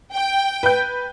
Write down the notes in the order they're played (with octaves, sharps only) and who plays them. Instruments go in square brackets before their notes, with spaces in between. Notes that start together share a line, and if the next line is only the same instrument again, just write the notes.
[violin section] G5
[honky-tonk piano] B4 G6